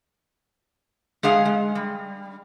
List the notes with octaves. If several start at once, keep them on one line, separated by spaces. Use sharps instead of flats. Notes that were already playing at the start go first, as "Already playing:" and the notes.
G#3 G#4 F5 F#5
G#3
G3